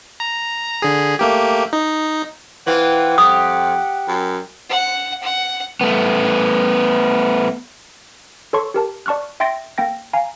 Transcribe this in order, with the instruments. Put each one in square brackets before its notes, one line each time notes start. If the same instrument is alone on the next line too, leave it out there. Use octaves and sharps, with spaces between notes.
[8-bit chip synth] A#5
D3 G#4
A3 A#3 G4
D#4
[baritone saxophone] E3 [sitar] C4 F4 [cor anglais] F#5
[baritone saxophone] F2 [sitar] G4 [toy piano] D#6
[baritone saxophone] F#2
[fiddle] F#5
F#5
[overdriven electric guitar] A3 B3
[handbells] A4 C#5 A5 C6 C#6
G4 A#4 A5
D5 A5 C#6 F6 F#6
E5 G5 C6 A6 A#6 D7
A#3 G5 A#6
F5 G#5 A#5